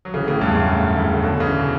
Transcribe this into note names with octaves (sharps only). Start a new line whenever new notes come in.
F#3
C#3 E3
A2 C#3
E2 G2
F#2 A2
A2 C#3
C#3
B2 D3
C#3 E3
B2